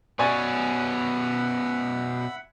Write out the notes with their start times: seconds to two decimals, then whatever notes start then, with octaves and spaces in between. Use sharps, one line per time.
0.19 B2 C#4 D5 E5 F#5 G#5 B5 C#6